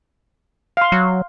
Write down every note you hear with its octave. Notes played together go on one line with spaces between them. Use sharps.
F5 C6
F#3